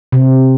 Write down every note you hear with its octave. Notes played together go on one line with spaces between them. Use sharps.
C3